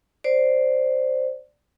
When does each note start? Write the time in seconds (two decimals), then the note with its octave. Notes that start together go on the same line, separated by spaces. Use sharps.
0.24 C5 D5